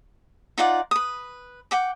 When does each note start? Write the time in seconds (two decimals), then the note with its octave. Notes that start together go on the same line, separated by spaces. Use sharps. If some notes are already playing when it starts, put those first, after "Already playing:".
0.58 D#4 F4 D5 F#5
0.91 B4 D#6
1.71 F#5 G5 D6